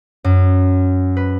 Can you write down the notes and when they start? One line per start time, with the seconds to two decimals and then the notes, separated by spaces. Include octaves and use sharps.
0.24 F#2
1.17 B4